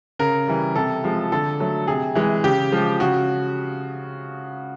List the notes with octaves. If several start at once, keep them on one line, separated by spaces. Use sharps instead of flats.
C#3 A#4
E3 G3
C3 A4
F3 G#3
D3 A4
F#3 A3
C3 G#4
E3 G#3
C#3 G4
F3 G#3
C#3 F#4